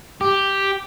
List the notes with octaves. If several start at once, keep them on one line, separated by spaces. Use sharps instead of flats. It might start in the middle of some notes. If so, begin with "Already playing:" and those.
G4